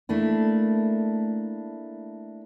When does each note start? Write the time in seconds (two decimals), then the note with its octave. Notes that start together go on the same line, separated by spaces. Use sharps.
0.09 A3 A#3 D4 E4